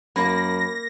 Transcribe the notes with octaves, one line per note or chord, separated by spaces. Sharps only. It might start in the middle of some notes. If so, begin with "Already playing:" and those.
F#2 A#3 B5 A#6